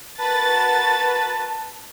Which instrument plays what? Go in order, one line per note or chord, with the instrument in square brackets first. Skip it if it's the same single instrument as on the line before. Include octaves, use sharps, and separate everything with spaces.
[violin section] F#4 A#4 A6 [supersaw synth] B4 [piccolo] A5